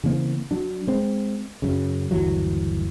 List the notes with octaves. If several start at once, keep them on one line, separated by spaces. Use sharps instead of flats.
C#3 E3 A#3 C4
F#3 D4
G#3 C4
F#2 C#3
G1 D#2 E3 F#3